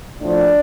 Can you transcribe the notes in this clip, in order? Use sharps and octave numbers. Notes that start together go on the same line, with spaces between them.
A2 F3 D4